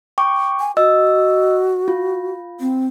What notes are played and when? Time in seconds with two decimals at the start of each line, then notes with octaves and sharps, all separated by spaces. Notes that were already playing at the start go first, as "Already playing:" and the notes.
0.18 G5 C#6 D6
0.60 G#5
0.77 F#4 D#5 E6
1.88 F4
2.60 C4